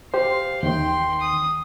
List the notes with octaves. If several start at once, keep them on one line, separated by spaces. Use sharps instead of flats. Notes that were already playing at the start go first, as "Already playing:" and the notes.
G4 C5 F5
D#2 D#3 G5 C6
D#6